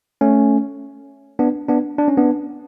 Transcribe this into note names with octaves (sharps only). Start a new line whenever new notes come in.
A3 C#4
B3 D4
B3 D4
D4
C#4
B3 D4